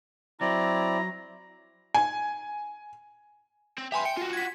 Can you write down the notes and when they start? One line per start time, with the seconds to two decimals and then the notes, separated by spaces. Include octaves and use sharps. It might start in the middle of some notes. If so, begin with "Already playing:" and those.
0.41 F#3 C4 E4 D5 A#5
1.94 G#5
3.78 C4
3.92 G4 B4 E5 G#5 C6
4.05 G5 C#7
4.17 F4 F#4
4.33 G#6 B6